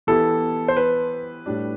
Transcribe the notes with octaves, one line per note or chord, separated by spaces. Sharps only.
E3 B3 E4 G4 A4
C5
B4
A2 G3 D4